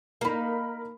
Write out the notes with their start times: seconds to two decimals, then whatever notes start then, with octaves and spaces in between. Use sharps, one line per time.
0.21 A#3 D#4 A#4 B5